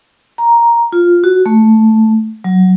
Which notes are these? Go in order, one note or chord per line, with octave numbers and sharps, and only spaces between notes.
A#5
F4
F#4
A3
F#3